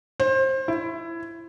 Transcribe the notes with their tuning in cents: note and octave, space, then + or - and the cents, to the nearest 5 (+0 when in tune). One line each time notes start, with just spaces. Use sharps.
C5 +25
E4 +20